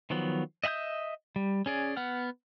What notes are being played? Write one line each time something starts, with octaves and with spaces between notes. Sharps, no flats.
D#3 F3 F#3 B3
D#5 E5 F#5 D#6 G6
G3
C#4 G#4 D5
B3 F#5 F6